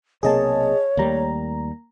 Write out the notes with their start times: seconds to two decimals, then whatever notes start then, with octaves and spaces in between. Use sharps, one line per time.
0.23 B1 C3 A#3 G#4 C#5 D#5 A5
0.97 D#2 G3 A3 A#3 A#5